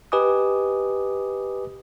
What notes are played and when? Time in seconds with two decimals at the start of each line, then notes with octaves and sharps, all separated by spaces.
0.12 G4 B4 D#5 G#5 D6 D#6